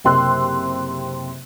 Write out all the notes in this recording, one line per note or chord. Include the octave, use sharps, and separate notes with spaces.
F#1 C3 G5 C6 E6 F#6